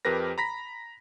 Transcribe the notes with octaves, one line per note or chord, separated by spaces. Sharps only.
F2 G4 A#4 B4 A#6
A#5 B5 A#6 B6